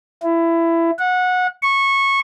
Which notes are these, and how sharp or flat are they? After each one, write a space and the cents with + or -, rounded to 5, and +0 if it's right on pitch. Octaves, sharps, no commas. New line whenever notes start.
E4 +20
F#5 -20
C#6 -15